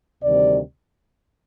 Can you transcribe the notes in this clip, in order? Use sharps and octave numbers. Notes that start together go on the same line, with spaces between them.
D2 C3 D#3 G3 D5